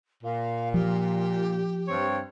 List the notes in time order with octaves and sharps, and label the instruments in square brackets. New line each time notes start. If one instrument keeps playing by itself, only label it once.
[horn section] A#2 [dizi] F5
[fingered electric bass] F3 [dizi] G4
[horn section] G2 C4 C#5